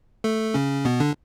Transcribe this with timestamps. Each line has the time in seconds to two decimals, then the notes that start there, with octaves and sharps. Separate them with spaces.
0.24 A3 A4
0.54 C#3 C#4
0.85 B2 B3
1.00 D3 D4